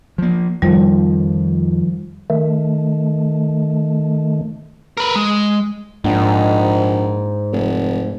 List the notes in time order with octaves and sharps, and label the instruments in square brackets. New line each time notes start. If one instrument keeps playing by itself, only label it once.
[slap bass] F3 A#3
[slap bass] F2 [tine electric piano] D#3 F3 [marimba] G3
[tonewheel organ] D#3 A3
[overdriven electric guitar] A#4 B4
G#3
[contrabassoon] A#1 [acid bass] G#2
[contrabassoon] F1